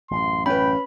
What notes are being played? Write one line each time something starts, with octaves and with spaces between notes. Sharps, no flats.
A1 F#2 C6
C#4 B4 G5 B5